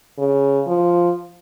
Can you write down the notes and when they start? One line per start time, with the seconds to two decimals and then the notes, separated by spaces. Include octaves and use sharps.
0.19 C#3
0.67 F3